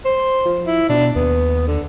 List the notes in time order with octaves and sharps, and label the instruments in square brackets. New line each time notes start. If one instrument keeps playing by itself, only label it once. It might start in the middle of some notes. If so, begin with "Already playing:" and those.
[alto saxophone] C5
[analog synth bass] F3
[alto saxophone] E4
[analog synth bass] B2 [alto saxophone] D4
[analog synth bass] D#2 [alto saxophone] B3
[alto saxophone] D3